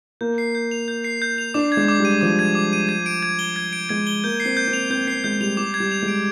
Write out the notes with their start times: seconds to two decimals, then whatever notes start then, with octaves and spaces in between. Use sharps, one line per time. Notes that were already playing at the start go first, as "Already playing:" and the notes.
0.21 A#3 G6
0.38 C7
0.55 G6
0.71 F7
0.88 G6
1.04 C7
1.22 G6
1.38 F7
1.54 D4 D6
1.72 G#6
1.77 G#3
1.88 D6
2.00 G3
2.05 D#7
2.21 F3 D6
2.39 G#6
2.55 D6
2.73 D#7
2.89 G#6
3.06 D7
3.23 G#6
3.39 G7
3.56 G#6
3.73 D7
3.89 G#3 G#6
4.07 G7
4.24 A#3 G6
4.40 C7
4.45 C4
4.57 G6
4.68 C4
4.73 F7
4.90 C4 G6
5.07 C4 C7
5.24 G#3 G6
5.41 G3 F7
5.57 G3 D6
5.74 G#6
5.80 G3
5.92 F7
6.02 G#3
6.08 D7